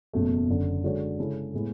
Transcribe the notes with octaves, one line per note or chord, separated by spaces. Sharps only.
F#1 E2 B2 F#3 A3
F#1 F#2 D3
D3 G#3 D4 F#4 C#5
C#3 G#3 C#4 E4 A4
A2 G#3 B3 E4